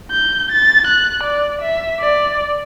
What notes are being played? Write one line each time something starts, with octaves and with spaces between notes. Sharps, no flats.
G6
A6
F#6
D5
E5
D5